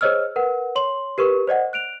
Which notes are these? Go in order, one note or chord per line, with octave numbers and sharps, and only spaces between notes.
G#4 C5 C#5 D#5 E6 F6
A#4 B4 F#5
C#5 C6 F#7
G4 A#4 B4 C#6
C5 D5 D#5 F#5
F#6 D7 F7